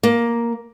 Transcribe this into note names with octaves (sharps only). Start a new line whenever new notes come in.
A#3